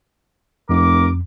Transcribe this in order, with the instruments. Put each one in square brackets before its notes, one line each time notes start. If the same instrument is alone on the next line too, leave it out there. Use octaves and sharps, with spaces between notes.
[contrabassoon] F1 [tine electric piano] F2 [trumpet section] A#4 D6